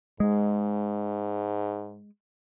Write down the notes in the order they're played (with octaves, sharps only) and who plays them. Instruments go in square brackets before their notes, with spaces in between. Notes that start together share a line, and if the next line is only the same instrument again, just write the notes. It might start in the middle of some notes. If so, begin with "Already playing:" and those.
[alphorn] G#2 [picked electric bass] G#3